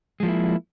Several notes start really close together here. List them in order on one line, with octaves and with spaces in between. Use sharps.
G#3 F3 A#3 E4